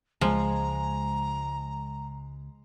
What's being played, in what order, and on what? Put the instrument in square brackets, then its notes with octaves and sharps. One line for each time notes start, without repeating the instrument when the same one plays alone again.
[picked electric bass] C#2 [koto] F3 [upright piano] G#3 G#5 [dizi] A#5